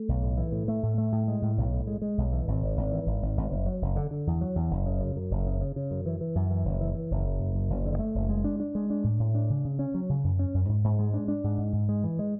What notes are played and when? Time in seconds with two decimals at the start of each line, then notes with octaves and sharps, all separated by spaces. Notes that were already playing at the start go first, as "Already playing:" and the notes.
Already playing: A3
0.08 B1
0.23 A2
0.37 E3
0.52 A2
0.68 A3
0.83 A2
0.98 A3
1.12 A2
1.28 G#3
1.42 A2
1.58 B1
1.73 A2
1.87 G#3
2.02 G#3
2.18 B1
2.33 E3
2.48 G#1
2.62 G#1
2.77 G#1
2.91 E3
3.06 G#1
3.22 G#1
3.37 G#1
3.51 F#1
3.66 F#3
3.82 F#1
3.96 D3
4.11 D3
4.27 E2
4.41 F#3
4.56 E2
4.71 F#1
4.86 C#3
5.01 F#2
5.16 F#2
5.31 F#1
5.46 C#3
5.61 C#3
5.76 C#3
5.91 F#2
6.06 E3
6.21 E3
6.35 F#2
6.51 E3
6.65 F#1
6.81 E3
6.95 E3
7.11 F#1
7.26 F#2
7.40 F#1
7.55 F#2
7.69 F#1
7.86 D3
7.99 A3
8.15 F#1
8.29 G#3
8.44 D4
8.60 D4
8.75 G#3
8.90 D4
9.04 A2
9.19 A2
9.35 D4
9.50 C#3
9.65 C#3
9.79 C#4
9.94 F#3
10.09 C#3
10.24 F#2
10.39 C#4
10.54 F#2
10.69 G#2
10.84 G#2
10.99 G#3
11.14 D4
11.28 D4
11.44 G#2
11.58 G#2
11.73 G#2
11.89 G#3
12.04 E3
12.19 G#3